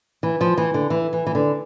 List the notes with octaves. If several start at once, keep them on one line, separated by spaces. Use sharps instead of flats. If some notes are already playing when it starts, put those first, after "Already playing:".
E3
F3
E3
D3
E3
E3
E3
D3